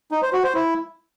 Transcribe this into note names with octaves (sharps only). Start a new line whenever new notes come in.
D#4
C5
F#4
C5
E4